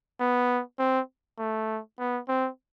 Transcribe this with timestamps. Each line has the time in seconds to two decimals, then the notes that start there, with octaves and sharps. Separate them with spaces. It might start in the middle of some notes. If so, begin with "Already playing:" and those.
0.20 B3
0.79 C4
1.39 A3
1.99 B3
2.28 C4